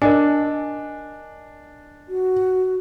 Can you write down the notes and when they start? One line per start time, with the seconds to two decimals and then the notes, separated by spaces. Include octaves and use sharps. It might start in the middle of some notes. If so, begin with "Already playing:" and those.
0.02 D4 A#4 D#5 G#5
2.08 F#4